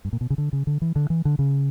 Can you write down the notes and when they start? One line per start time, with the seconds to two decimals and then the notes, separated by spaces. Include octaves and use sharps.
0.05 G2
0.13 A#2
0.21 B2
0.30 C#3
0.38 D3
0.53 C#3
0.67 D3
0.82 E3
0.96 D3
1.10 E3
1.25 D3
1.39 C#3